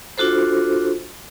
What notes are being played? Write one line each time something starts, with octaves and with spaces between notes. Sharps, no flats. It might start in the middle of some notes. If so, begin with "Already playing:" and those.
D4 F4 F#4 A4 C5